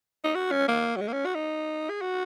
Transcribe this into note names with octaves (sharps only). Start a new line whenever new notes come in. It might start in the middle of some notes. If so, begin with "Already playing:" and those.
D#4
F#4
C#4
A#3
F#3
G#3
A#3
C#4
F#4
D#4
G#4
F#4